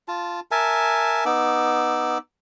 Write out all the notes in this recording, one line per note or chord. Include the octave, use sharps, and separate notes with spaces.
F4 A5
A#4 E5 G#5 A5
B3 D#4 D6 E6